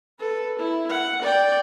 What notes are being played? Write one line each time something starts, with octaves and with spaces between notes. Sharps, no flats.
A4 B4
E4
F#5
D5 G5